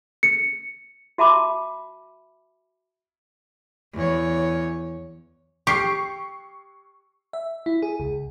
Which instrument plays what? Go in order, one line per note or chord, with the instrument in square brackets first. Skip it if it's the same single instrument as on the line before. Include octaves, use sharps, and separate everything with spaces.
[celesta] C#7
[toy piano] F#4 E5 A5 B5 D6
[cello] E2 C#5
[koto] G4 [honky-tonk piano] C#6 C7
[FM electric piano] E5
E4
G#4
C#2